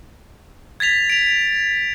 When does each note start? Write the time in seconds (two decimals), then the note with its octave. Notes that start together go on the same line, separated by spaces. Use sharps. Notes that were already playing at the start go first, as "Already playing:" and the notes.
0.80 G#6 A6 B6 F7
1.10 D7 F7